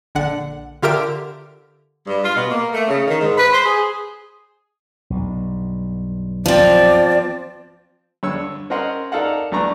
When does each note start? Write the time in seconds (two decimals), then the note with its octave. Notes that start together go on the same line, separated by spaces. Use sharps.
0.15 A#1 D3 F#5
0.82 D3 F4 G4 A#4 E5 D7
2.07 G2
2.23 F4
2.36 B2
2.50 A#3
2.73 A3
2.88 C#3
3.08 D#3
3.20 G#2
3.37 B4
3.52 C5
3.65 G#4
5.10 B1 G2
6.46 F3 C4 D5
8.23 G2 D3 C#5 E6
8.70 C4 C#4 A#4 D#5 F#5 C6
9.12 D#4 A4 A#4 D5 F5 F#5
9.52 C2 A3 D4 B4 A#5 C#6